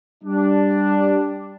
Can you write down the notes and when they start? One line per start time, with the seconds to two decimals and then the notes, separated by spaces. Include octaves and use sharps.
0.24 G3 D4